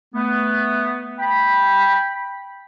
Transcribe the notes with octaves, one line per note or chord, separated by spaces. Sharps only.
A3 B3
G5 B5